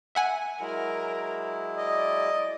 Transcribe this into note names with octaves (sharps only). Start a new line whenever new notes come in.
E5 F#5 G#5
F#3 G#3 E4 A#4
D5 D#5